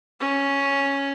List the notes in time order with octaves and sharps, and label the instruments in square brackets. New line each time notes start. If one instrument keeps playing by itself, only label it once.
[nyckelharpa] C#4